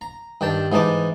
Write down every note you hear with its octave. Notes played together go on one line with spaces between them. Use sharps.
A#5
G2 D#3 G5 A5
G#2 E3 D#4 A5 D6